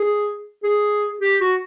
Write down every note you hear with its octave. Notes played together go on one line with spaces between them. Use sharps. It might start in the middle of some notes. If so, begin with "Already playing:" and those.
Already playing: G#4
G#4
G4
F#4